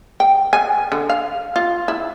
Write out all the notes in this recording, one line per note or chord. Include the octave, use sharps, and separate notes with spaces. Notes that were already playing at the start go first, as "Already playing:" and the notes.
G5
G#5
D3
F5
F4
E4